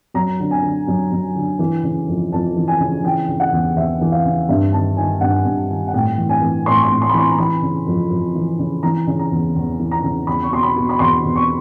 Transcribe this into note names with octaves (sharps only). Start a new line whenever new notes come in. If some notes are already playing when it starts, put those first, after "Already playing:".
F#2 A#5
D3
G#5
D3
F#2
F#2
D3
E3
C#3
F2
F2 A5
E3
G#5
C#3
E3 G5
C#3
F#5
E2
E2 E5
E3
F5
C#3
G2 E5
D#3 A5
D#3 G#5
G2 F#5
G2
D#3
F#5
A2 G5
E3
G#5
E3
A2 C6
C#6
C6
A2
C6
B5
E3 C6
A#5
E3 B5
C#3
F2
F2
E3
C#3
E3 A#5
C#3
A#5
E2
E2
E3
A#5
C#3
E2 B5
C#6
B2 C6
B5
B2
B5
E2 C6
E2
C#6